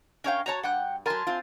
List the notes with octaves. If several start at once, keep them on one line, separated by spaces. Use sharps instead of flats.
C#4 A#4 C#5 F5 G5
F#4 C#5 A5 A#5
G2 F#5 G5 F#6
F#3 A#4 G#5 A5 C6
C4 F4